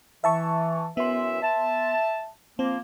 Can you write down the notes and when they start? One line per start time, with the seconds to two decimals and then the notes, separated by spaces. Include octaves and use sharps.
0.24 E3 E5 A5 C#6
0.97 F#2 E3 B3 E5 C6
1.43 E5 A5
2.59 F3 A#3 C4